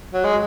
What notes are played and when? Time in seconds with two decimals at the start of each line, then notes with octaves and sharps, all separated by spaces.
0.13 F#3
0.24 G#3